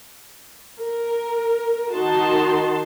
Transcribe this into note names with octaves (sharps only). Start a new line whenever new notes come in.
A#4
D#3 D#4 F#4 A5 C6